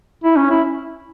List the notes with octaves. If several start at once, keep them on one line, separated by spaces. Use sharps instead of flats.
E4
C#4
E4